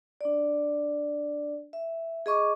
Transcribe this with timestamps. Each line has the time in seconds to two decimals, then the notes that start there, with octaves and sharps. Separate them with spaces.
0.21 D4 D5
1.73 E5
2.26 G#4 D#5 C#6 D6